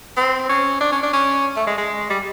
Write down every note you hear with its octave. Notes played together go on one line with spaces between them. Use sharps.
C4
C#4
D4
C#4
D4
C#4
A3
G#3
G#3
G3